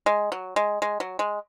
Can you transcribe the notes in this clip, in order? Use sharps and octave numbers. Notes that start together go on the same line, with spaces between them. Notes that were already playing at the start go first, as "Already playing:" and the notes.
G#3
F#3
G#3
G#3
F#3
G#3